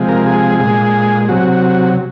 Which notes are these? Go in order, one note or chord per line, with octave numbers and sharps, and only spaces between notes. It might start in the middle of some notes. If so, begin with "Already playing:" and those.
Already playing: C3 F3 G#3
A#4
G#4
A#2 G#3
C3 F#3 F#4